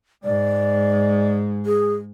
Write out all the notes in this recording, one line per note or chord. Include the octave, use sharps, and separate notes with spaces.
G#2 G#3 D5
G#4